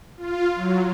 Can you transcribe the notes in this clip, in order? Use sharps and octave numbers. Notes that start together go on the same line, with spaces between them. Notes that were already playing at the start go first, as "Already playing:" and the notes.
F4
F#3